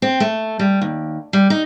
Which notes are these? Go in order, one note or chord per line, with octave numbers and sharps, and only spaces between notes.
C4
A3
G3
D#2
G3
D#4